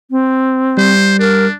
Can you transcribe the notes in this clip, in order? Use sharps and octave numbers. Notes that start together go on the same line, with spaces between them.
C4
G3 C5
D4 A#4